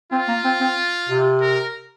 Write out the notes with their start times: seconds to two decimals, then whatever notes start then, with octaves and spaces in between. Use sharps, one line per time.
0.12 C4 F4
0.28 A#3
0.44 C4
0.61 C4
1.09 C3
1.41 A#4